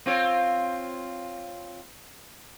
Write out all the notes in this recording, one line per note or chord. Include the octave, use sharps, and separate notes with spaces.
C4 F4 C#5